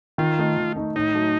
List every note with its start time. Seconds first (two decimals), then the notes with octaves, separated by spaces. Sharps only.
0.18 D#3 F4
0.38 A3 D#4
0.58 D#3
0.76 A3 D#4
0.96 A2 D#4
1.14 F#3 A3